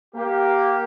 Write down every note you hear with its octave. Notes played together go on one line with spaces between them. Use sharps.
A#3 G4